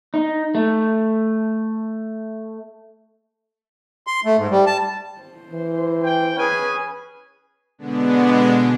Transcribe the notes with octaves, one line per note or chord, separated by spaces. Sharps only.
D#4
A3
C6
A3
G#2
G3
A5
C5
E3
G5
C#4 G#4 B4 G#5
B2 D3 G#3 B3 D4